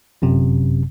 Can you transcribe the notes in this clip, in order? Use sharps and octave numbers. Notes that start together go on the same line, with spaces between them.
G1 F#2 C3